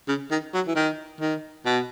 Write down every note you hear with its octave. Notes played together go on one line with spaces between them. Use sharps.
C#3
D#3
F#3
E3
D#3
D#3
B2